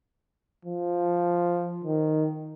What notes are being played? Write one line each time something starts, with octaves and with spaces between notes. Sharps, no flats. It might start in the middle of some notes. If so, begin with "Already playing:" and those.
F3
D#3